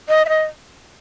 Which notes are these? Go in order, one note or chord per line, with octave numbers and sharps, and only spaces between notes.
D#5
E5
D#5